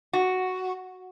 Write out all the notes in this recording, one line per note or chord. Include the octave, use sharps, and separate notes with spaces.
F#4